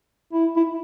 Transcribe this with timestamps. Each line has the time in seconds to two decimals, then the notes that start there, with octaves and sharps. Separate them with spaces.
0.33 E4
0.56 E4